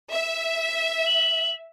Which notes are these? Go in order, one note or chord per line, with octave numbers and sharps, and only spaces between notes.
E5
F#7